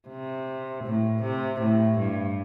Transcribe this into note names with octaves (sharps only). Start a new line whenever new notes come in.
C3
A2
C3
A2
G2